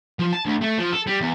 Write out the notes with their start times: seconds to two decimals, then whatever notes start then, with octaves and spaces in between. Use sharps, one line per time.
0.19 F3
0.33 A5
0.46 D2
0.62 A3
0.79 F3
0.93 A4
1.07 G3
1.21 E2